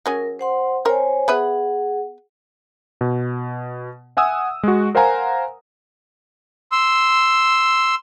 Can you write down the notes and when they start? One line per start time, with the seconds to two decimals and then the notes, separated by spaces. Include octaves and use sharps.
0.06 F#3 C#4 G#4 A#4
0.39 C5 F#5 C6
0.85 C4 A#4 C5 C#5 G#5
1.28 B3 G#4 B4 E5 F#5
3.01 B2
4.17 E5 F#5 G#5 D#6 E6
4.63 G#3 F#4
4.95 A#4 C5 F5 F#5 G#5 A#5
6.72 C6 E6